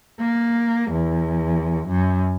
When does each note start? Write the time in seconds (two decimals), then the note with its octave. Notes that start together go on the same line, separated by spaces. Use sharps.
0.19 A#3
0.91 E2
1.88 F#2